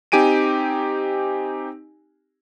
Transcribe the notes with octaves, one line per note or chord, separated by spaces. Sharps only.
C4 D#4 G4 G#5 D7 D#7